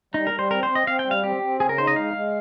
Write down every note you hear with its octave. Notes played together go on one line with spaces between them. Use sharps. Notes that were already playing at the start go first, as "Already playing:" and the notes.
G3 D#4
A#4
G3
C5
C4 A#4
C5
C4
D#5
C4 F5
G5
G3
F5
C4 G4
C4
C#3 G#4
A#4
D#4 C5
D#5
G#3 F5
G#3